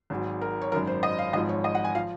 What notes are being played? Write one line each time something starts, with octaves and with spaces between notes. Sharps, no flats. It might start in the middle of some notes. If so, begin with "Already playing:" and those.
G#1 G#2 F#3
A#4
C#5
G#1 F#2 D#3 F#3 A#4
C5
D#5
F5
G#1 G#2 F3 D#5
C#5
D#5
F#5
G#5
F3 F5